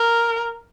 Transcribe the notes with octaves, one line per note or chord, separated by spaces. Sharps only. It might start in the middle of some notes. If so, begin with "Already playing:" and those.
Already playing: A#4